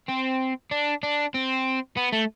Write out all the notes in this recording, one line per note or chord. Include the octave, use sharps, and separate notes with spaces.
C4
D4
D4
C4
B3
A3